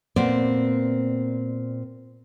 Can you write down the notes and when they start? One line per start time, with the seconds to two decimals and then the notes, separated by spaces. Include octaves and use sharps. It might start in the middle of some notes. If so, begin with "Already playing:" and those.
0.16 A#2 B3 C4 D5